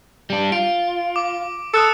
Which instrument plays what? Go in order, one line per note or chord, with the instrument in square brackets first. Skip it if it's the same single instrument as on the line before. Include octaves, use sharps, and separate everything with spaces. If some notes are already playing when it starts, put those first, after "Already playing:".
[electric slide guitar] G3 D4
[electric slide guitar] F4 [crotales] D7
[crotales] D6
[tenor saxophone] A4 [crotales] D#6 F#6 C#7